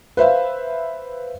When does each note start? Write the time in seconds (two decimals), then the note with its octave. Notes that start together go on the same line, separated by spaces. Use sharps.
0.17 B4 C5 E5 F5